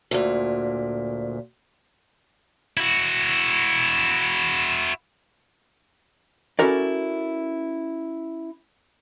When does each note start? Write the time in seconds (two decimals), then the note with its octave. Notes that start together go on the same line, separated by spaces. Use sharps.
0.11 D2 A#2
2.77 E4 F#4
6.59 C#4 E4 F#4 A4 A#4 D5